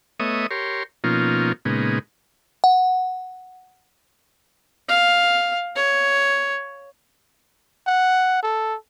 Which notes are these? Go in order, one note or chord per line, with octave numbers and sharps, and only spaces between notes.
A3 B3 C#5 D#5 E5 D#6
G4 A#4 C#5 C6
B2 F3 A#3 C#4 D#4 F4
A#2 C#3 G#3 B3 D#4
F#5
F5
C#5
F#5
A4